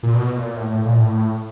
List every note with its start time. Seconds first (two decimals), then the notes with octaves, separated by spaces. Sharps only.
0.03 A#2
0.15 B2
0.36 A#2
0.56 A2
0.70 A2
0.85 A#2
0.99 A2